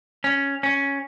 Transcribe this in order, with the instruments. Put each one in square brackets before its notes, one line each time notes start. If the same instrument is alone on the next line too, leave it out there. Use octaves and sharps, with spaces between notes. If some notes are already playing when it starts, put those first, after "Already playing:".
[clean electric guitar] C#4
C#4